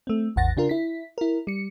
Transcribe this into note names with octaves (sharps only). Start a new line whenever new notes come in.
A3 C4
A1 E2 F#5 A6 A#6
C#3 D4 F4 A#4
E4 B6
E4 A#4
G3 C#7